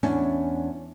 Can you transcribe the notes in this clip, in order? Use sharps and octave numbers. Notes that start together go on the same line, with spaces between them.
E2 C#4 D4